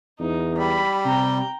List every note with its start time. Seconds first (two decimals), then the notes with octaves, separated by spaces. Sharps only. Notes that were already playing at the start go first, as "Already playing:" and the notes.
0.20 E2 D#4
0.58 G3 B5
1.05 C3 G5 A#5